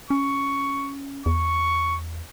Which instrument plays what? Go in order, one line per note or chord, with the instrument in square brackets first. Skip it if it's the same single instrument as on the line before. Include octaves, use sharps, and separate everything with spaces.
[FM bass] C#4 [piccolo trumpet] C#6
[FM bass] E2 [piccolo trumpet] C#6